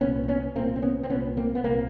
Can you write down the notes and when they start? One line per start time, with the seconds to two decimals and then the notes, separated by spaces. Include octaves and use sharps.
0.01 C2 A#2 B3 C#4
0.23 C4
0.28 B3 C#4
0.55 C2 A#2 A#3 C4
0.76 C4
0.82 B3 C#4
1.03 C4
1.09 C2 A#2 B3 C#4
1.37 A#3 C4
1.55 B3
1.64 C2 A#2 A#3 C4